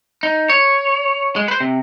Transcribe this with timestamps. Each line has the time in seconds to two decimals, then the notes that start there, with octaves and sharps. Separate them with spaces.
0.23 D#4
0.50 C#5
1.36 G#3
1.48 B4 C5
1.60 C3